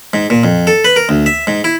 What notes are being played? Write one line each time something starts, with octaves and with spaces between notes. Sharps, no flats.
G#2
A#2
F2
A4
B4
A#4
D2
E5
G#2
E4